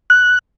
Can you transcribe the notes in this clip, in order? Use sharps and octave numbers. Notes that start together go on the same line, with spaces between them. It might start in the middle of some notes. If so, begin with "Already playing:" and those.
F#6